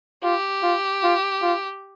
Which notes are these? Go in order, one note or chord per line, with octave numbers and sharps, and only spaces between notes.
F4 G4
F4
F4
F4